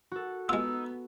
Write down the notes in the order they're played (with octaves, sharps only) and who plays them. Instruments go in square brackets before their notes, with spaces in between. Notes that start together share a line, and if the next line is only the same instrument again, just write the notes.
[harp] F#4 A4
[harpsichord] G#3 F4 [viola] B3 [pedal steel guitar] D#4 E6